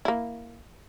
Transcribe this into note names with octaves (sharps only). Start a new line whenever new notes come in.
A#3 E4